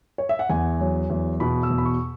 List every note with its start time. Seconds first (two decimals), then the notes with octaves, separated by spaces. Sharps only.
0.18 C#5
0.29 E5
0.39 F#5
0.50 E2 G#5
0.80 F#3
1.10 E2
1.40 B2 B5
1.63 E6
1.70 E2
1.78 B5
1.85 C#6